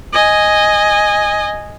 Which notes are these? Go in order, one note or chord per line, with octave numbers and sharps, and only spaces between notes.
D#5 G#5